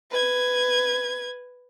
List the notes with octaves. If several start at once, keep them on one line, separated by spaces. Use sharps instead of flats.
B4 G#6